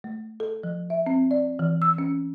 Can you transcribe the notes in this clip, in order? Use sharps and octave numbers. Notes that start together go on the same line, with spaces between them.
A3
A4
F3
E5
C4
D5
E3
E6
C#4